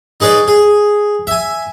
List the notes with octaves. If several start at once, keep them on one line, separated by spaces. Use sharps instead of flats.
D#4 G#4 B4 C#5 D5
G#4
E5 G#5